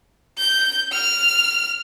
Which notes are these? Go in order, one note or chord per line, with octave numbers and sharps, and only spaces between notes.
G6
F6